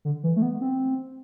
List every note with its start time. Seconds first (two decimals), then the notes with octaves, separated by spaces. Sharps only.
0.05 D3
0.23 E3
0.36 A3
0.42 B3
0.61 C4